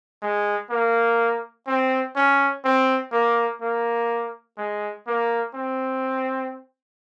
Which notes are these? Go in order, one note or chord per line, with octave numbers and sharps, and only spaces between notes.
G#3
A#3
C4
C#4
C4
A#3
A#3
G#3
A#3
C4